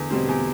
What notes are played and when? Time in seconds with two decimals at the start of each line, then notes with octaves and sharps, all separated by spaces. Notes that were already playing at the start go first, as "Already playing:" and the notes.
Already playing: E2 D3
0.10 B2 G3 C4
0.28 E2